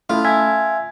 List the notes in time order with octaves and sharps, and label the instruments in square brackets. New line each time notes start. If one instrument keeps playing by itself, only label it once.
[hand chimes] A3 C#4 A4 [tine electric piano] E4 [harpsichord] F4
[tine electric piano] E5 [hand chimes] G#5 G#6